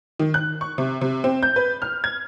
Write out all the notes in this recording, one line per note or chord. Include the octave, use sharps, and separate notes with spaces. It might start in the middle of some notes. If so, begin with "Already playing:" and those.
D#3
F#6
C#6
C3
C3
C4
G6
B4
F6
G#6